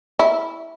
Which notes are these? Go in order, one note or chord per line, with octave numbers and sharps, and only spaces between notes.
E4